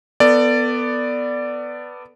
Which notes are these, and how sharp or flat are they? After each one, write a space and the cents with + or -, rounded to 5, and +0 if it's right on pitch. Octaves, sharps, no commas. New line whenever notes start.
B3 +5 A4 +35 D5 +0